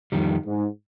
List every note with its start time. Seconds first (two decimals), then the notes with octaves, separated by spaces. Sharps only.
0.12 F2 D#3 G3
0.46 G#2